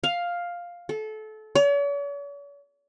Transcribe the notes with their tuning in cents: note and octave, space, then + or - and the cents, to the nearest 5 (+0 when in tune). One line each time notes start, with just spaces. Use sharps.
F5 +5
A4 -25
C#5 +45